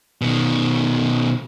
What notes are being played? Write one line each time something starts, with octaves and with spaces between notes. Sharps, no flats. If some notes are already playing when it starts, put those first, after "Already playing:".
B2 D#3